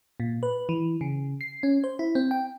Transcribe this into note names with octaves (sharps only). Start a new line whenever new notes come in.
A#2
B4
E3
C#3
C7
C#4
C5
E4
C4
G5